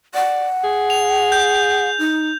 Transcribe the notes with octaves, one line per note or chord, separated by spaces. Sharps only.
D5 F#5
G#4
F7
G6
D#4